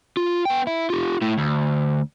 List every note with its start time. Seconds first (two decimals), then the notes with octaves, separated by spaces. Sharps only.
0.17 F4
0.45 B3 G5
0.67 E4
0.90 F4 G4
1.22 A3 E4
1.38 D2